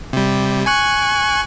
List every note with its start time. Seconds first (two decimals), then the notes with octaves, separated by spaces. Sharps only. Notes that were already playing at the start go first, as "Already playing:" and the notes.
0.13 C3 G3
0.66 G#5 C#6 F#6